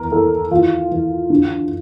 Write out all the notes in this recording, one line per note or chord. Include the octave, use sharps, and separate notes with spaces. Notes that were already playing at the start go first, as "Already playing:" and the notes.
Already playing: E2 E3 A#4
E3 A4
E3 F4
E3
D3